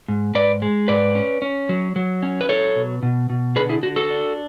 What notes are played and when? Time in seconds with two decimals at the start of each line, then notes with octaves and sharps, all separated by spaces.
0.08 G#2
0.35 G#2 B4 D5
0.62 G#3
0.88 G#2 B4 D5
1.15 C#4
1.42 C#4
1.69 F#3
1.96 F#3
2.23 C#4
2.41 B4
2.49 F#3 A4 C#5
2.76 B2
3.03 B2
3.30 B2
3.56 D3 G#4 B4
3.69 E4 G#4
3.83 D3 F#4
3.96 F#4 A4
4.10 D4